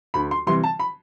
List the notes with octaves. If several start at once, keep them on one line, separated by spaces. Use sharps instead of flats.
D2 B5
C6
C3 E3 G3 C6
A5
B5